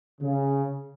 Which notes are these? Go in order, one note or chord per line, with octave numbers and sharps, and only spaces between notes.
C#3